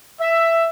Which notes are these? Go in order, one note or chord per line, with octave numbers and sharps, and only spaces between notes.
E5